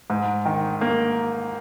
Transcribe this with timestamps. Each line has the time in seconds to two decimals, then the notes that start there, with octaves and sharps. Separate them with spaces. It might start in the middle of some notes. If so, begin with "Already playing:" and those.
0.10 G#2
0.45 D#3
0.81 A#3